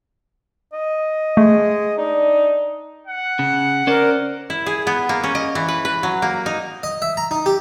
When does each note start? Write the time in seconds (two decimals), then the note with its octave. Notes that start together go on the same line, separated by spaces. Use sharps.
0.73 D#5
1.37 G#3 A3
1.98 D4 D#4
3.07 F#5
3.39 C#3
3.87 C#4 A#4 C5 D5
4.50 E4
4.66 G#4
4.87 B3
5.09 A#3
5.24 C#4
5.35 D#5
5.55 E3
5.68 B4
5.85 B4
6.03 F#3
6.22 A#3
6.46 D#4
6.83 D#5
7.02 E5
7.17 A#5
7.31 D#4
7.46 G4